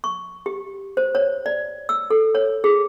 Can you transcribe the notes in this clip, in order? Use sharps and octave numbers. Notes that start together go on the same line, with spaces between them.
C#6
G4
C5
C#5
D5
E6
A4
C#5
G#4